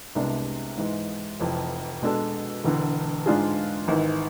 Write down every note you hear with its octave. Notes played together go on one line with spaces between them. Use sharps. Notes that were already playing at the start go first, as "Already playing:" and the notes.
C2 C3 G#3 B3 D4
G#2 E3 G#3
F1 F2 E3
B2 G#3 D4 A4
E1 E2 D3
G#2 G#3 D4 F4 G#4
G#1 G#2 E3